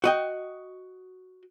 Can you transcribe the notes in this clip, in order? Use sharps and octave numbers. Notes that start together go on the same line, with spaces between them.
F#4 D#5 G5